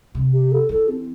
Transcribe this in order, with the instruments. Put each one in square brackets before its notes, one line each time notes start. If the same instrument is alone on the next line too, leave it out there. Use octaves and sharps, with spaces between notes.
[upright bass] C3
[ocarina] G4
A4
[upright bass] E3 [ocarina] A4
[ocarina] C4